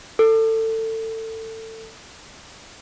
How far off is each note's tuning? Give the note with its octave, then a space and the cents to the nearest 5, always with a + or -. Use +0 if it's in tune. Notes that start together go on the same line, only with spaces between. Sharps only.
A4 +25